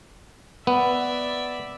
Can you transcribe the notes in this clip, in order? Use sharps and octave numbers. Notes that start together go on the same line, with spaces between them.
B3 D5 E5